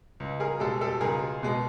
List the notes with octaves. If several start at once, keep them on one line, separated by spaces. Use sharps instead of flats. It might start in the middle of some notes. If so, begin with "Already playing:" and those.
C#2
G#4 A#4
B2 G#3 G4 A4
G4 A4
C#2 G#4 A#4
B2 G#3